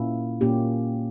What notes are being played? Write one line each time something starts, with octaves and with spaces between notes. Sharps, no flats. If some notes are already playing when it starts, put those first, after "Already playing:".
Already playing: A#2 A#3 C#4 E4
A#2 A#3 C#4 G4